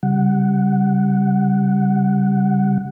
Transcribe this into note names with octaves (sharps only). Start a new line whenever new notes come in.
C#3 G3 F#5